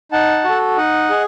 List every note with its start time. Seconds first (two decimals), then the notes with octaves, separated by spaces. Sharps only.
0.12 D#4 F#5 A5
0.44 F#4 A4
0.77 D#4 D#5 F#5
1.10 G#4